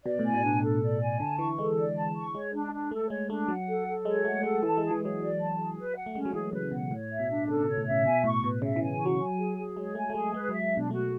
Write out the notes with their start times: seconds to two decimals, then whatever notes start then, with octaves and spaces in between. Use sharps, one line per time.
0.05 B2 D5
0.19 A2
0.25 G#5
0.34 B2
0.44 D4
0.62 A4
0.82 D5
1.01 G#5
1.20 D3 A5
1.38 E3 C#6
1.58 G#3 A4
1.77 D5
1.96 A5
2.15 C#6
2.34 G#3 C#5
2.53 D4
2.72 D4
2.91 A3 A4
3.10 G#3 C#5
3.29 A3 D4
3.48 F#3 F#5
3.68 A4
3.87 A4
4.05 G#3 C#5
4.25 A3 F#5
4.43 G#3 A4
4.63 E3 A5
4.77 G#3 G#4
4.91 E3
5.01 F#3 G#4
5.20 D5
5.39 A5
5.57 G#4
5.77 B4
5.96 F#5
6.06 A3
6.15 G#3 C#4
6.25 F#3
6.33 E3 G#4
6.53 C#3 B4
6.71 B2 F#5
6.91 A2 C#5
7.10 E5
7.20 B2
7.30 D4
7.48 C#3 A4
7.62 B2 C#5
7.77 A2
7.86 C#3 E5
8.05 B2 G#5
8.24 A2 C#6
8.43 B2 B4
8.62 C#3 E5
8.76 E3
8.82 G#5
9.01 F#3 C#6
9.20 G#5
9.39 G#4
9.58 G#4
9.76 G#3 C#5
9.95 A3 G#5
10.10 A3
10.14 G#3 G#4
10.34 G#3 B4
10.49 F#3 E5
10.73 B2 D4
10.91 A3 F#4